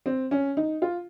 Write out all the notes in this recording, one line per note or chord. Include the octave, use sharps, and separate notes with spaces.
C4
C#4
D#4
F4